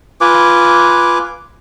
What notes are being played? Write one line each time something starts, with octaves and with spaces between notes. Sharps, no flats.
F4 B4 G#5 D6